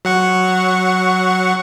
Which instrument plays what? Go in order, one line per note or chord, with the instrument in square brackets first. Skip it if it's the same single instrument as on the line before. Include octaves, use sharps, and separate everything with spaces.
[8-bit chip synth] F#3 F#5 C#6